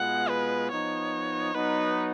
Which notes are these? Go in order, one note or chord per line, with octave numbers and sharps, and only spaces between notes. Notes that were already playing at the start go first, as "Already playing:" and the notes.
Already playing: B2 G#3 B3 F4 F#5
B4
F3 B3 D#4 C#5
F#3 B3 D#4 B4